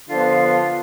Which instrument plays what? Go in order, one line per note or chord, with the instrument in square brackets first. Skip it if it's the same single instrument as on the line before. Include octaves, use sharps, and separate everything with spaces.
[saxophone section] D3 F3 B3 [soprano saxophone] F4